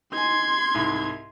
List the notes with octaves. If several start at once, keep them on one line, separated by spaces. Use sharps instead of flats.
D#4 G#5 C6 G#6
C2 G#2